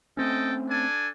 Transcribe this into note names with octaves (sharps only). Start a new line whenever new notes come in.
A3 C4 C#4 A4 D#5 G5
D4 A4 G#5